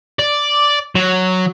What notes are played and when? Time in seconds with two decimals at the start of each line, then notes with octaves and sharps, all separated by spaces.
0.19 D5
0.95 F#3